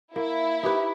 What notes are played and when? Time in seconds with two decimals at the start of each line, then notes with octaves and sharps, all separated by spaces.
0.16 A#3 E4
0.63 D#4 G4 B4